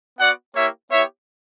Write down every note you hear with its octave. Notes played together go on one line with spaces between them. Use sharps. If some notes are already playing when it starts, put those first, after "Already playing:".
B3 F#4 D5 F#5
A#3 E4 G4 C#5 E5
B3 E4 G4 C#5 E5